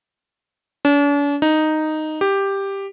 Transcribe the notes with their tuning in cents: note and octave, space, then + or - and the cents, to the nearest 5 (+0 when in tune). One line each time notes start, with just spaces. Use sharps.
D4 -45
D#4 -5
G4 +5